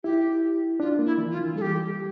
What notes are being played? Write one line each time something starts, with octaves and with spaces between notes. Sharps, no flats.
E4 G4
D4 F4
A#3
E4
E3
F4
E3
G3 A4
G4